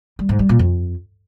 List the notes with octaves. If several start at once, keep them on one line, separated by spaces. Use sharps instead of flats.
G3
G#2
G3
A#2
F2